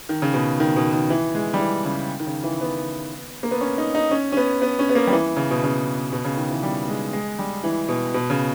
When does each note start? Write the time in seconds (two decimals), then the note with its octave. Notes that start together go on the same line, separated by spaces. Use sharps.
0.09 D#3
0.22 C#3
0.34 B2
0.60 D#3
0.76 B2
0.93 D#3
1.10 E3
1.35 G#3
1.54 G3
1.59 E3
1.85 C#3
2.20 D#3
2.27 C#3
2.43 E3
2.61 B3
3.43 A#3
3.51 B3
3.61 C#4
3.78 D#4
3.95 D#4
4.11 C#4
4.32 C#4
4.37 B3
4.62 B3
4.79 C#4
4.89 B3
4.95 A#3
5.07 G3
5.13 E3
5.37 C#3
5.50 B2
5.64 C#3
6.12 B2
6.24 C#3
6.37 D#3
6.50 E3
6.63 G3
6.88 G#3
7.13 G#3
7.39 G3
7.64 E3
7.88 B2
8.14 B2
8.30 C#3